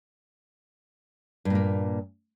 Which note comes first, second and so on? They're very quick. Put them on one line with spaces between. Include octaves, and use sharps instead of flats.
G2 A#2 A#3